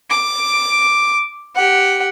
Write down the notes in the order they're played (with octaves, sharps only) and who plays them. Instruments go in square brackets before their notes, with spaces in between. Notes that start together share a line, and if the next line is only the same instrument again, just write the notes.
[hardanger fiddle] D6
G4 F#5